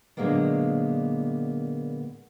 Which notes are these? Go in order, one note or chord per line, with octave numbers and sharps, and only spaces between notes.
A#2 D3 F#3 G#3 A#3 B3